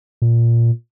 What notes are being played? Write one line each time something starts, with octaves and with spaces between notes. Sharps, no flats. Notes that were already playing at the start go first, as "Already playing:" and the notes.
A#2